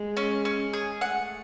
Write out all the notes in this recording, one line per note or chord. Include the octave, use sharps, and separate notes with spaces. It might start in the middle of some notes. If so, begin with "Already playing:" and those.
Already playing: G#3
C#4
C#4
G#4
A3 F#5